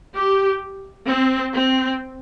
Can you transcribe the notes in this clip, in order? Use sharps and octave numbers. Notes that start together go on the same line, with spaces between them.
G4
C4
C4